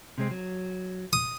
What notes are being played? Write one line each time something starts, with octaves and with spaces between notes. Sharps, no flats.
C3 G#3 C4
F#3
D#6